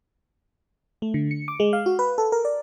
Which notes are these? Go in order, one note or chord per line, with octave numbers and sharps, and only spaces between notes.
A3
D3
C#7
D6
G#3
F5
F#4
B4
A4
A#4
D5